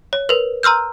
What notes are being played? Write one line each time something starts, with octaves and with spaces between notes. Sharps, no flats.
C#5
A#4 B4
A#5 C6 E6 F6 G6